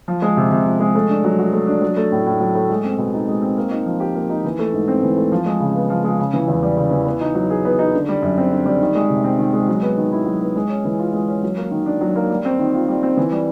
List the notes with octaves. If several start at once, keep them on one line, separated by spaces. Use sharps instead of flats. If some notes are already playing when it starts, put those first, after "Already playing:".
F3
G#3
C3
C3
F3
G#3
A3
D4
F#3
F#4
A3
D4
F#3
A3
A2
A2
F#3
A3
G#3
C4
B2
D#4
G#3
C4
A#3
D#4
F3
G4
A#3
D#4
E3
A3
G#2
C4
E3
A3
F3
G#3
C#3
B3
F3
G#3
C#3
E3
E2
G3
C#3
E3
B3
D#4
F#3
G#4
B3
D#4
D3
G3
F#2
C4
D3
G3
D#3
G#3
C3
C4
D#3
G#3
F#3
B3
D#3
E4
F#3
B3
G#3
C#4
E3
F4
G#3
C#4
F#3
A#3
D#3
D4
F#3
A#3
G3
C4
D#3
F4
G3
C4
E3
G3